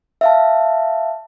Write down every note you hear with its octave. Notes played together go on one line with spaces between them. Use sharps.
E5 F5 A5